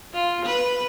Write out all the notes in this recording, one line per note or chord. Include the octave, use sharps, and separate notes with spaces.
F4
B4